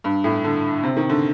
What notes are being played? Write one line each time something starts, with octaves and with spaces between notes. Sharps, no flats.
G2
A2
D3
C3
D#3
D3